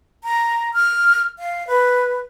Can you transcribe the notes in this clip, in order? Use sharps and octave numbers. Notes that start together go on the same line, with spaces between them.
A#5
F6
F5
B4